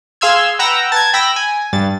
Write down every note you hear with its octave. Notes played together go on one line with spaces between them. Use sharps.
G#4 F5 C6 E6 F6 G#6
B4 F#5 G5 A#5 E6 A#6
A5 G#6
G5 B5 E6 A#6
G#5
G2 A6